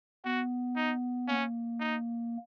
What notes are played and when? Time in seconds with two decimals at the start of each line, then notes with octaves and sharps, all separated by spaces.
0.25 B3 F#4
0.76 D#4
1.28 A#3 C#4
1.80 D#4